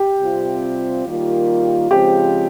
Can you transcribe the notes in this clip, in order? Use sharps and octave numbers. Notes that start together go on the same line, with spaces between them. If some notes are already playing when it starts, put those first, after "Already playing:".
Already playing: G4
C3 G3 C4 F4
D#3 G3 A#3 F4
C#3 F3 G#3 C4 F4 G4